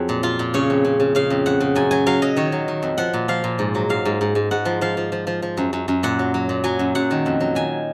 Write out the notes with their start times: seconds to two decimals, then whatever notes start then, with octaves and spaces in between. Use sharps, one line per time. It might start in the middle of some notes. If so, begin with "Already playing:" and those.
Already playing: F2 F#3 G#4
0.09 A#2
0.23 A#2 F4
0.39 A#2
0.54 C#3 C#5
0.70 F2
0.85 C#3
1.00 C#3
1.15 C#3 F5
1.30 F2
1.46 F2 F#5
1.60 C#3
1.76 F#2 G#5
1.91 F#3 G#5
2.07 F#3 F5
2.22 F#3 D#5
2.37 D#3 C#5
2.52 F#3
2.68 D#3
2.83 F2
2.98 F3 F#5
3.14 A#2
3.28 F3 F5
3.44 A#2
3.59 G#2
3.75 F#3
3.90 G#2 F5
4.05 G#2
4.21 G#2
4.35 G#2
4.51 G#2 F#5
4.65 F3
4.81 F3 F5
4.97 F3
5.12 F3
5.27 F3
5.42 F3
5.57 F#2
5.73 F#2
5.88 F#2
6.03 A#2 F#5
6.19 F#3
6.34 F#3
6.49 A#2
6.64 F#3 G#5
6.79 F#2
6.95 F#2 F#5
7.11 D#3
7.26 F2
7.41 F#3
7.55 D#3 G#5